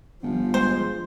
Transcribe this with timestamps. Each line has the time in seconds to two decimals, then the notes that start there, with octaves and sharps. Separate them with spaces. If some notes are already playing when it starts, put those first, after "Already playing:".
0.23 G1 F3
0.54 G#3 C5